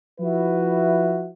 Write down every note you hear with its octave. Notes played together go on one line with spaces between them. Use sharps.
F3 E4 F#4 B4 E5